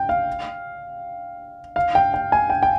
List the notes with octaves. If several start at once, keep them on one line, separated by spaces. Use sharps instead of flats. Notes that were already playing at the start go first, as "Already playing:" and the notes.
Already playing: G5
F5
F5
G5
G5
G#5
G5
G5